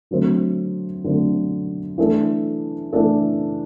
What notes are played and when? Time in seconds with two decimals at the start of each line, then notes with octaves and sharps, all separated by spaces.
0.11 D3 F#3 A3 C4
1.04 D3 F#3 A3 C4
1.98 E3 A3 D4 A4
2.93 E3 A3 D4 A4